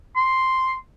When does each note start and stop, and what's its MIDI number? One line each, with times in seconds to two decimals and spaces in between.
0.16 0.75 84